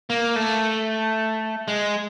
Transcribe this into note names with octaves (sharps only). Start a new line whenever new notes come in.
A#3
A3
G#3